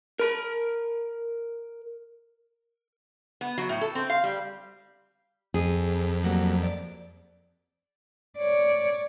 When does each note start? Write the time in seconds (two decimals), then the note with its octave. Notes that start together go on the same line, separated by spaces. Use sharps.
0.19 A#4 B5
3.41 B3
3.58 F#3
3.69 A2
3.81 A4
3.95 C4
4.10 F5
4.24 G3
5.54 F2 G#4
6.23 F#3 G3 A#3
6.63 D5
8.38 C#5 D5